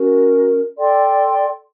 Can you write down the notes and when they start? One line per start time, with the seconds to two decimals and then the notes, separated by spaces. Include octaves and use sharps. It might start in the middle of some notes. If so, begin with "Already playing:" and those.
Already playing: C#4 F#4 A#4
0.76 A4 D5 G5 C6